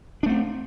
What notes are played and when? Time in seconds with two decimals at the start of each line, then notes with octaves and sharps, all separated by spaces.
0.23 D4
0.26 A3
0.29 C4